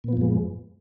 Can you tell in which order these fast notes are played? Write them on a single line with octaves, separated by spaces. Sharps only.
A#2 B3 F3 F#2 G#3